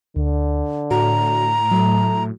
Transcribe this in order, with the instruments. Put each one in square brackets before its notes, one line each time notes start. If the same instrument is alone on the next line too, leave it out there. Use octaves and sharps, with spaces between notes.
[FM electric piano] D2 [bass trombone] D3
[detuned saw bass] A2 [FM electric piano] F#4 [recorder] A#5
[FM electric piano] F#3 [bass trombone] A3